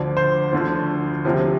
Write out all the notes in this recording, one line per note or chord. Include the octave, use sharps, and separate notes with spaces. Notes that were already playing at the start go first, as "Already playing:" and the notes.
Already playing: D2 D3 F3 D5
C5
D2 D3 F3
D2 C3 F3